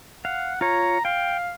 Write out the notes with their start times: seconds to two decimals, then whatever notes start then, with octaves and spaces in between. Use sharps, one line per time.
0.25 F5 F#5
0.61 F4 C#5 A#5
1.05 F5 G5